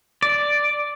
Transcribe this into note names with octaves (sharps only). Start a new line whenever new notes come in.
D5